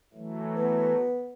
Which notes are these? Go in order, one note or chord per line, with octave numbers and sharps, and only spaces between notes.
E3 F#3 A3
B3